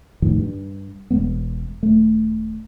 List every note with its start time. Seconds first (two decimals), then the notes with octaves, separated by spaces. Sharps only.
0.22 F2 A2 D#3 F3
0.39 G2
1.11 E1 B2 G#3 B3
1.83 D#1 A3